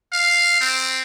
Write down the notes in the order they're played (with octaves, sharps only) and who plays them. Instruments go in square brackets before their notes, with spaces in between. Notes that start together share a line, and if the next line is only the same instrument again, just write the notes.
[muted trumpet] F5
C4